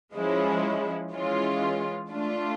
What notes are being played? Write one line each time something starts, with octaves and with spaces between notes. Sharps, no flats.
F3 G#3 C#4 E4
E3 G#3 C#4 F4
A3 D4 F4